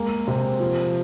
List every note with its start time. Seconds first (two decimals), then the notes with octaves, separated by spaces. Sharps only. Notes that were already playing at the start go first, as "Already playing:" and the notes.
Already playing: G#3 A#3
0.28 C3
0.60 F3